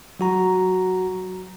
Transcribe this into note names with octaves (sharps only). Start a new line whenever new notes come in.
F#3 F#4 A#5